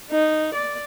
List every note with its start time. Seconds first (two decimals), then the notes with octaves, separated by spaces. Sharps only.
0.11 D#4
0.55 D5